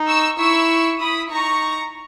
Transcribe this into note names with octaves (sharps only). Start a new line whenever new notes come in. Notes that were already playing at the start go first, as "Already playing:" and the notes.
Already playing: D#4
C#6 E6
E4 C#6 E6
E4 B5 D#6
D#4 A#5 C#6